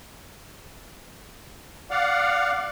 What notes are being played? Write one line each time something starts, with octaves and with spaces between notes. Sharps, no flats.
D5 F5 F#5